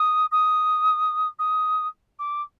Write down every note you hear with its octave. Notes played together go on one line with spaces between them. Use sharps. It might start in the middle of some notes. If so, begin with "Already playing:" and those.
Already playing: D#6
D#6
D#6
D6